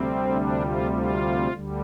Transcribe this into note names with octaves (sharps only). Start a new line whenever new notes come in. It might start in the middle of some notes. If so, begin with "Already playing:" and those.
Already playing: D2 C3 G3 C4
D4
F4
F4
D2 D3 G3